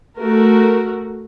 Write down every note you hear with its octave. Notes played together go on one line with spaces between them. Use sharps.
A3 F#4 A#4